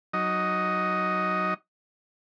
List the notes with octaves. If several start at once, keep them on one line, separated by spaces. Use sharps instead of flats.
F#3 D#4 D#5